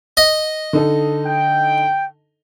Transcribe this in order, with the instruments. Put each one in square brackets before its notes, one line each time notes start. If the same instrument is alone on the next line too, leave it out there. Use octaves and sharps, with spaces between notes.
[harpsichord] D#5
[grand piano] D3 D#4 A4
[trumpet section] G5